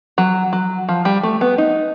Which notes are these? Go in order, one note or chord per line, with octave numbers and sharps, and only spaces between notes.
F#3
F#3
F3
G3
A3
B3
D#4